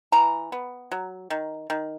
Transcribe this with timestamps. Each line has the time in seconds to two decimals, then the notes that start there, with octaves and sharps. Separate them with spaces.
0.12 E3 A#5
0.52 B3
0.92 F#3
1.30 D#3
1.70 D#3